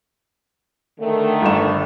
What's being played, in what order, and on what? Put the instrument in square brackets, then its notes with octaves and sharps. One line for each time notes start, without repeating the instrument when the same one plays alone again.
[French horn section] D3 D#3 A3
[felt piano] G1 E7